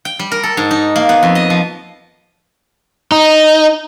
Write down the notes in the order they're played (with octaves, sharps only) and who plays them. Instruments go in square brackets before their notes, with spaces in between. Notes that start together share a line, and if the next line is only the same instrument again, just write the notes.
[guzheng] G5
G3
A#4
A4
G#2
D#4
A#3
B3
F2
D#5
F3
[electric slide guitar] D#4